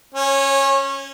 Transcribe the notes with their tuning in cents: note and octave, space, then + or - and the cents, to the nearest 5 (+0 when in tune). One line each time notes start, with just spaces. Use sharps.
C#4 -15 C#5 -30